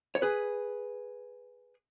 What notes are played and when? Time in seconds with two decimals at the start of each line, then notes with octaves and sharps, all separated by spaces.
0.15 C#5
0.22 G#4 B4